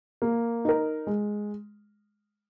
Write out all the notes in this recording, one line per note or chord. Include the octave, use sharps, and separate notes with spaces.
A#3
D#4 A#4
G#3